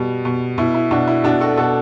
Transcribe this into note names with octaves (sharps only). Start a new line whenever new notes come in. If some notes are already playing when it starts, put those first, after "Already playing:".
Already playing: B2 G3
B2
B2 E4
E4
B2 D4 F#4
E4
B2 D4 F#4
F#4 A4
B2 F#4 A4